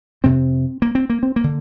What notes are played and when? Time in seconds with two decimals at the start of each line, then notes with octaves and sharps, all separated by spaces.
0.24 F2 C3 C4
0.82 A#3
0.95 C4
1.10 A#3
1.23 C4
1.36 A#3
1.44 D3